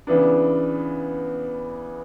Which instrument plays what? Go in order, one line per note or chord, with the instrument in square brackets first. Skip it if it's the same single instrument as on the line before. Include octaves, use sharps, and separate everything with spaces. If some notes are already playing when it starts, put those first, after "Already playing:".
[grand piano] C#3 E3 B3 D4